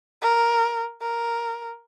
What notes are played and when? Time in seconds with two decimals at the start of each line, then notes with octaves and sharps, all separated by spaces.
0.22 A#4
1.02 A#4